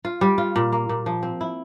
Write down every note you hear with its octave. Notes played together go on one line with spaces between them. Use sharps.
F4
G3
F4
A#2
A#3
A#2
F3
C4
E4